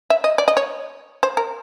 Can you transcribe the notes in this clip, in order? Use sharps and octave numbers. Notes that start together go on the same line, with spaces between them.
E5
D#5
D5
D#5
C#5
C5
A#4